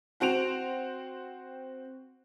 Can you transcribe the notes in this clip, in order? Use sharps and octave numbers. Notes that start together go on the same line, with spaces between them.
C4 F#4 C5 D7 F7